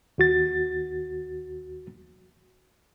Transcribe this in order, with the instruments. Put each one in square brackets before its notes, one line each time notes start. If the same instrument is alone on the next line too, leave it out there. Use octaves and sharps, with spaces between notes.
[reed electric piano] D#2 F#4 A6